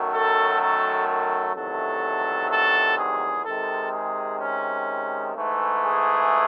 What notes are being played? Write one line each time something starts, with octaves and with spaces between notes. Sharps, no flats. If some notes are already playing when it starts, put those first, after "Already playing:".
Already playing: F#2 D#3 F#3 A3
A4
A4
A4
E2 C3 D#3 F#3 A3 A4
A4
G#4
C3 D#3 G#3 A4
G#4
C#4
G#2 E3 A3
G#4